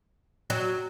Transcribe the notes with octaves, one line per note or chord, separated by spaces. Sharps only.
F#3